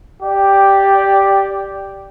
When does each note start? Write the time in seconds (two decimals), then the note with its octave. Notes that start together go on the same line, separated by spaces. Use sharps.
0.22 G4 D5